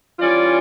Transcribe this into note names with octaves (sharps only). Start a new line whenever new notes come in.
E3 G3 C#4 F4 D5